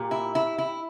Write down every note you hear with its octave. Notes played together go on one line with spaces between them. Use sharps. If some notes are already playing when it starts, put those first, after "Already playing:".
Already playing: A#2 G4
E4
E4
E4